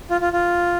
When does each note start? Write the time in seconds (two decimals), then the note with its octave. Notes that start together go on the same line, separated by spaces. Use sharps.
0.10 F4
0.21 F4
0.33 F4